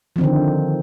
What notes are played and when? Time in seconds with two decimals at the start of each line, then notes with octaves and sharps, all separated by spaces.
0.16 F3
0.18 C4
0.21 D#3
0.23 D3